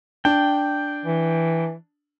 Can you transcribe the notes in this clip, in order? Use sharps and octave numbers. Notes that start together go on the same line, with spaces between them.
D4 G5
E3